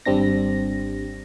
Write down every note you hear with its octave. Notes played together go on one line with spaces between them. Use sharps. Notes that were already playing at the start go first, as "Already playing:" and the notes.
G#1 G3 C4 D4 A#6